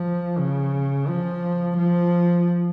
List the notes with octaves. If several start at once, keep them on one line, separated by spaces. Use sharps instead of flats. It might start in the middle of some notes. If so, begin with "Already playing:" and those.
Already playing: F3
C#3
F3
F3